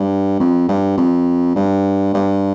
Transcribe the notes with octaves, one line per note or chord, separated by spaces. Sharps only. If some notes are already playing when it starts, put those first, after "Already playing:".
Already playing: G2
F2
G2
F2
G2
G2